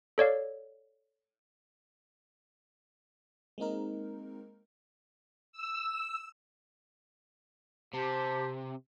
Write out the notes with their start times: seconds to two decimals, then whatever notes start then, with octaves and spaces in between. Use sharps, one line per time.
0.18 A4 C#5 D5 F5
3.58 G#3 A#3 C4 D#4 A#4
5.52 E6
7.94 C3 G4 C5 A5